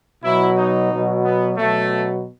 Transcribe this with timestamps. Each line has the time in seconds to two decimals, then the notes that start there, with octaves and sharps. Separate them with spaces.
0.23 B2 F#3 E4
0.57 D#4
0.90 B2 F#3
1.24 B3
1.57 B2 F#3 A3